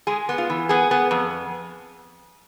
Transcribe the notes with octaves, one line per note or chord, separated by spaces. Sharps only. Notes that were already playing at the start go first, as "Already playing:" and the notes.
G#3 G#4
B3
F4
E3
B3 G#4
B3
F2